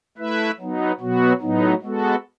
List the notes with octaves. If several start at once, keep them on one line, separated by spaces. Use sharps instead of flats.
A3 E4 B4 E5
F#3 B3 D#4
B2 F#3 B3 F#4
A2 F#3 B3 D#4
G#3 B3 F#4 A4